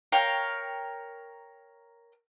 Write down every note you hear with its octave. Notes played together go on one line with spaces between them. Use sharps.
A#4 C#5 F5 G5